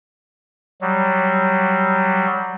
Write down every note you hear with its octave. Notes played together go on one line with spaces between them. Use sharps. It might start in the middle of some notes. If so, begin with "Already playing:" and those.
F#3 G3